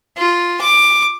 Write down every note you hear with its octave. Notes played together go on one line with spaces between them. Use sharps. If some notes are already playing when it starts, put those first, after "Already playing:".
F4
D6